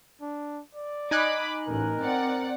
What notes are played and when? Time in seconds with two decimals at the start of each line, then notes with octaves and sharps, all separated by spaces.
0.21 D4
0.75 D5
1.11 D#4 G#5 B5 D6 F#6
1.67 A1 A#4
1.99 C4 D5 F#5